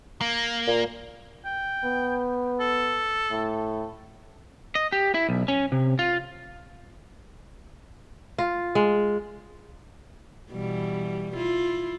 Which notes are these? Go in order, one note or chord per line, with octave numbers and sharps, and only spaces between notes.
A#3
A#2
G5
B3
A4
A2
D#5
G4
E4
B1
C#4
C3
F4
F4
G#3
B2 E3 G3
E4 F4